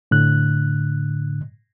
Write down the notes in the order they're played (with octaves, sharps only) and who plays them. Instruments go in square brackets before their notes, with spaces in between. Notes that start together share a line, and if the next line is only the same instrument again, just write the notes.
[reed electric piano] A2 D3 F#6